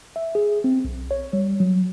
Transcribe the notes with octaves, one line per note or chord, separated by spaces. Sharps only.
E5
G#4
C4
B1
C#5
G3
F#3